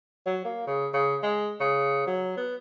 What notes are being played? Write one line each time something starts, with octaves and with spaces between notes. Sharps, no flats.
F#3
A#3
C#3
C#3
G#3
C#3
F#3
B3